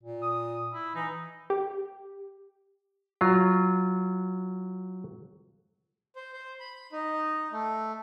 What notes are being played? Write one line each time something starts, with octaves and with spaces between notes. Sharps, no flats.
A#2
D#6
E4
E3 D#4
G4
F#3 F4
C5
C5
B5
D#4
A3